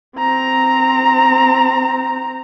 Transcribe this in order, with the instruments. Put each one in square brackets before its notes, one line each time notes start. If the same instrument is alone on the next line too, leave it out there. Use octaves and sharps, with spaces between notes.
[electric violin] C4 A#5